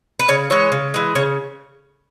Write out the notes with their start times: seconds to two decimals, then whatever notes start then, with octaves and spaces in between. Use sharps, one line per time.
0.19 B4
0.28 C#3 C#5
0.50 E3 G#3 C#5
0.72 C#3
0.94 E3 G#3
1.15 C#3 C#5